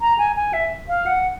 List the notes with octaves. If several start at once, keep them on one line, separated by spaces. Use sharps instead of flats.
A#5
G#5
G#5
E5
F5
F#5